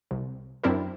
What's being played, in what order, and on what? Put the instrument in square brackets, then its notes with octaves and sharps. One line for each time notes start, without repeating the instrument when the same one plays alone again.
[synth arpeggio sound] C2
F#2 C4 D4 E4 A#4